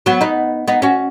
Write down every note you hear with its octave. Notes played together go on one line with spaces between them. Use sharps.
F#3 B3
B3 D#4
B3 D#4
C#4 F#4